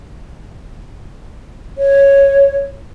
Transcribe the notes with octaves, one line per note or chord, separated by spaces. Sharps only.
C#5